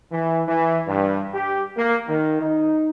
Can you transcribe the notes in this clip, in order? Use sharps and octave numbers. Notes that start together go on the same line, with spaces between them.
E3
E3
G2
G4
A#3
D#3
D#4